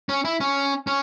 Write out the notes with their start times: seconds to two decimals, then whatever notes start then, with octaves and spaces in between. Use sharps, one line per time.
0.09 C#4
0.25 E4
0.40 C#4
0.87 C#4